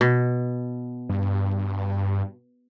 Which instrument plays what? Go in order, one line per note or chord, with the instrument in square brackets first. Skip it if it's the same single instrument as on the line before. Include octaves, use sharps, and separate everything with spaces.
[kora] B2
[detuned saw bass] G2